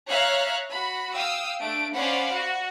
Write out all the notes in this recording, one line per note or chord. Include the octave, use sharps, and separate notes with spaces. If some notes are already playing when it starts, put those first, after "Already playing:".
C#5 E5 F5 A#5 F6 F#6
F#4 B5
F5 G5 D#6 E6
A3 D4 D7
C#4 C5 D5 F5 F#5 B5
F#4